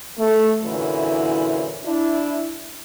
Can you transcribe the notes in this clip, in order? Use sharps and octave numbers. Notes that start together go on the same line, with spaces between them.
A3
F#2 A#2 D3 E3 E4
D4 E4